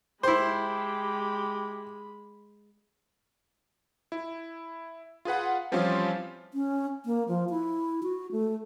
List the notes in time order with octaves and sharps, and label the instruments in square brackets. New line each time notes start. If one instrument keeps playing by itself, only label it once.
[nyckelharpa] G#3 B5 [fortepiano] E4 C5 [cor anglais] G4
[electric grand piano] E4
F4 G#4 B4 F#5
E3 F3 G3 C4 C#4 F4
[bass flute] C#4
A#3
F3
E4
F#4
A3